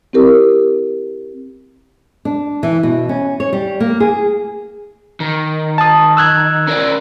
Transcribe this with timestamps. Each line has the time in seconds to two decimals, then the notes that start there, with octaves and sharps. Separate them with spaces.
0.13 C4 E4 G4 A#4
2.25 D4
2.63 E3
2.83 B2
3.09 C#4
3.40 C#5
3.53 G3
3.80 A#3
4.00 G#4
5.20 D#3
5.78 A5 D#6
6.17 E6 F#6 G#6
6.67 C#4 A#4 D5